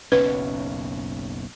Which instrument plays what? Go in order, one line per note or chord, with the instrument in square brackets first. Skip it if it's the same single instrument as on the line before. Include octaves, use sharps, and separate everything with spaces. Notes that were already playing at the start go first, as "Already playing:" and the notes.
[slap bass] F#1 B1 C#4 [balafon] B4